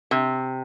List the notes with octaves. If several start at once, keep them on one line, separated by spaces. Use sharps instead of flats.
C3